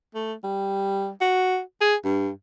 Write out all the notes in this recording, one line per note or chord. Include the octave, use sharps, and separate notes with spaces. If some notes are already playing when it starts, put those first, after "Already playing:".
A3
G3
F#4
G#4
G2